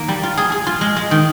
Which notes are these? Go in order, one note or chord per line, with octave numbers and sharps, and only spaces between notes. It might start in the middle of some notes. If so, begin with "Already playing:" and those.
Already playing: D#3 A#3
G3
F4
G#4
G#4
F4
G#3
G#3
D#3